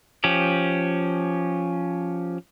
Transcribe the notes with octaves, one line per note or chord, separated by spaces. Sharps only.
F3 C#4 G4